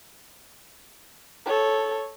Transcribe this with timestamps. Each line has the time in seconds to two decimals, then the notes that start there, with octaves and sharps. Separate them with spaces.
1.46 A4 C#5